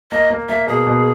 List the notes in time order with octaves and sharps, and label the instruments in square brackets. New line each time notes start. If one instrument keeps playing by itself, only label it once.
[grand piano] A#3 [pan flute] D#5
[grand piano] A#3
[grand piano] A#3 [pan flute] E5
[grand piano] B2 [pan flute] G#4
[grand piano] B2